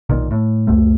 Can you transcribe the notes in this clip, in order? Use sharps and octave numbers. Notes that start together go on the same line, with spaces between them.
B1 A#2 D#3
A2
C#2 F#2 A3